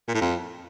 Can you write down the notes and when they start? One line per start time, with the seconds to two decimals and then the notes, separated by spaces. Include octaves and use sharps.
0.07 A#2
0.14 A2
0.21 F2